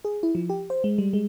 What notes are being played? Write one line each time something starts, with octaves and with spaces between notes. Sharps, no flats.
G#4
E4
F3
G4
C5
G#3
G3
G#3